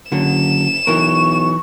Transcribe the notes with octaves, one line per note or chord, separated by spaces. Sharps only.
F#1 D3 F#3 E7
B1 E3 A#4 C#6